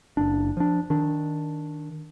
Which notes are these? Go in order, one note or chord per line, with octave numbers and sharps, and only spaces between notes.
F#1 D4
F3 D4
D#3 D4